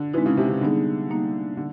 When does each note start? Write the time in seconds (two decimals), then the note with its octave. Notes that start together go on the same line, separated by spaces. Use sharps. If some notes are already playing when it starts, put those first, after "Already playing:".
Already playing: D3
0.14 E3 G#3 C4 D#4
0.26 C#3
0.37 C3
0.49 C#3
0.61 D3 G3 B3 D#4 G#4
1.10 G3 A#3 D#4
1.57 D3